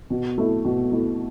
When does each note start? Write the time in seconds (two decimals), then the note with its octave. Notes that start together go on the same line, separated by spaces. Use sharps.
0.10 B2
0.38 A3 E4
0.65 B2
0.92 A3 E4